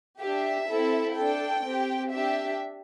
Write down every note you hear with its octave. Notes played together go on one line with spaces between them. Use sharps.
D4 G4 E5
C4 E4 A4
D4 A4 G5
C4 G4
D4 G4 E5